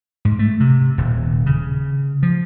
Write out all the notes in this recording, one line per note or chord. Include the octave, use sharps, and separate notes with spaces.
G#2
A3
C3
D#1
C#3
F3